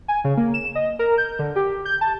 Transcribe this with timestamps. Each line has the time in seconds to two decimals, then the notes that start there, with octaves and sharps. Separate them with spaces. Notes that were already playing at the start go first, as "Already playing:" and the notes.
0.08 G#5
0.24 C#3
0.37 A#3
0.54 E7
0.75 D#5
0.99 A#4
1.18 G6
1.39 D3
1.56 G4
1.85 G6
2.01 A5